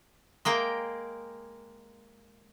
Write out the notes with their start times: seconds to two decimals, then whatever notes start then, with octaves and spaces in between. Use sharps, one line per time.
0.45 G#3 A#3 G5